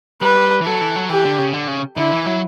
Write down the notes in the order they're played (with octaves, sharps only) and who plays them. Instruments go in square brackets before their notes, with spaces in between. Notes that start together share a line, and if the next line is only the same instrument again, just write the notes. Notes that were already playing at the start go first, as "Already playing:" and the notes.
[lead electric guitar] G3 [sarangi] B4
[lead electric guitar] E3
[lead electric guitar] F#3 [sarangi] A4
[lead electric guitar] E3
F#3
[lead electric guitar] E3 [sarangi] G4
[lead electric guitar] D3
C#3
D3
C#3
[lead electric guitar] D3 [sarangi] E4
[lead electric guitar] E3
F#3